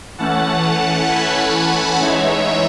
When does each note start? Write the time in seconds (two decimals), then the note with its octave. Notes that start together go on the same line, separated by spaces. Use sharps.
0.18 E3 A3 C#4 F#5 A5
1.09 G#5 B5
2.00 E3 G#3 D#4 C#5 E5